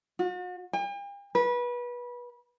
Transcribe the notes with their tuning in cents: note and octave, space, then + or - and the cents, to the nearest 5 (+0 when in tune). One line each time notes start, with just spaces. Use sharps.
F#4 -40
G5 +45
B4 -25